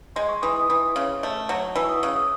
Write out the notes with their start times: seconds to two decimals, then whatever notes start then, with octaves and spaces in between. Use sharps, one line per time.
0.16 G#3 C6
0.29 C#6
0.42 E3 D#6
0.56 D#6
0.69 E3 D#6
0.96 C#3
1.23 A3
1.49 F#3
1.76 E3 E6
1.85 C#6
1.89 D#6
2.03 C#3 C#6
2.16 D#6